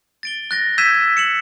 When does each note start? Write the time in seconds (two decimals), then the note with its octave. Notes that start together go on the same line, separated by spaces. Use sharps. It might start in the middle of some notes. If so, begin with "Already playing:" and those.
0.23 A6 D7 G7
0.51 F#6 A6 A#6
0.78 E6 G6 G#6 B6 D#7 E7
1.17 C#7 E7 F#7